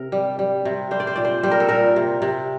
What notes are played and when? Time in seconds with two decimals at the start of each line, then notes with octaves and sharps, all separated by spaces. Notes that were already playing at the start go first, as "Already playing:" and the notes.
Already playing: C3 A#4
0.12 G3
0.39 G3
0.65 C3
0.91 G3 C5
1.00 D5
1.07 C5
1.16 A#2 D5
1.25 C5
1.43 G3 C5
1.51 A#4
1.60 A4
1.68 A#2 A#4
1.96 C3
2.22 C3